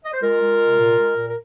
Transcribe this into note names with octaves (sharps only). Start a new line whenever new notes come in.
D#5
C5
G#3 F4 A#4
G#3
C3
A#2
G#3
A#2
A#4